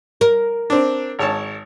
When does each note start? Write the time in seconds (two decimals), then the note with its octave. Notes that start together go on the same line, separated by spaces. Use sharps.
0.21 A#4
0.70 C4 D4
1.19 G#1 C#5 A5